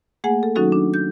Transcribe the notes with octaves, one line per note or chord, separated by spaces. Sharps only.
A3 A#3 G#4 F#5 G#5
A4
D#3 F#3 C#4 D#4 F#4 A4
D4
G6